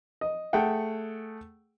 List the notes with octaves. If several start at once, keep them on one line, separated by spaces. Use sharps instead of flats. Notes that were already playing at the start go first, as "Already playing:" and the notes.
D#5
A3 G#4 F#5 G5